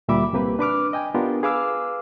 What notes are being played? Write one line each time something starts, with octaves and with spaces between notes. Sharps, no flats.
D2 A#2 G3 E5 B5 D6
C2 C3 A#3 G4 B4
D4 B4 D6 F6
D#5 G5 G#5
B3 D4 F4 G4 A#4
G#4 B4 F5 D6 E6 F6